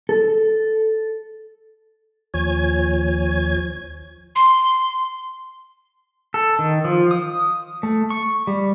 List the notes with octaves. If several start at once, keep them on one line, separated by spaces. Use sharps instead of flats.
A4
D#2 F3 C#5 G#5 G#6
C6
A4
D#3
F3
D#6
A3
C#6
G3